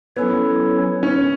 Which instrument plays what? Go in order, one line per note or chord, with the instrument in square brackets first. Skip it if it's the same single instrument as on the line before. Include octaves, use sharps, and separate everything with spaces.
[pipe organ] F#3 C#4 E4 A4 C#5 [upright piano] B3
[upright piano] C#4